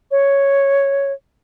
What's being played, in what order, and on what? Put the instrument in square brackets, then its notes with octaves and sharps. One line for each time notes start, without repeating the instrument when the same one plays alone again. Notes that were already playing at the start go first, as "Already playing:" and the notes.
[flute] C#5